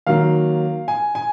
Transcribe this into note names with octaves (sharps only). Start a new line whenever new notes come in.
D#3 F#3 A#3 F5
G#5
G#5